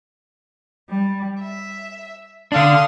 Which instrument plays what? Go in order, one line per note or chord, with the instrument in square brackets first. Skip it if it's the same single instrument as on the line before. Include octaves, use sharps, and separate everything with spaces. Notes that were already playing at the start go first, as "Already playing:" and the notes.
[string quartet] G3
E5
[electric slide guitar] D3 D4 [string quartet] F5 C6 D#6